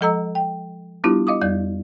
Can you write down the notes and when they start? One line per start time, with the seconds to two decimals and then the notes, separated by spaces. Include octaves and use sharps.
0.01 F3 G#3 A4 D#5 A#5 E6
0.35 G5
1.04 G3 B3 D4 E4 F4 G4
1.27 D#5 F5 D6 D#6
1.42 F2 G3 D5 G6